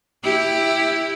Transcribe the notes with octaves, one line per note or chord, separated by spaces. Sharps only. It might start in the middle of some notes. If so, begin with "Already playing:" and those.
E4 G4